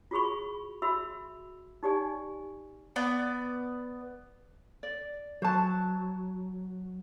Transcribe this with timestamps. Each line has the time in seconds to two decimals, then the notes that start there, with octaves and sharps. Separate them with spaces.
0.11 F4 F#4 G#4 B5 C#6
0.82 F#4 E5 B5 E6
1.83 D#4 G4 D5 G#5
2.96 B3 D5
4.83 D5
5.42 F#3 C5 A5